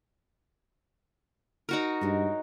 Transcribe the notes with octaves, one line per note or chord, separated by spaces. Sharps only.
D#4 F#4 A#4
G2 F#3 G#3